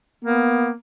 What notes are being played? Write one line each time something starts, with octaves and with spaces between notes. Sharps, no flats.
A#3 B3